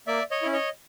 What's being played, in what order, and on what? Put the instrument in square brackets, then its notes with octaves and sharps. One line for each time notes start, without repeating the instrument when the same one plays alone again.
[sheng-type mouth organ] A#3 D5 E5
C#5 D#5
C#4 E4
C#5 D#5